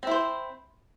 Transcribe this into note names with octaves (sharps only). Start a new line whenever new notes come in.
C4 E4 C5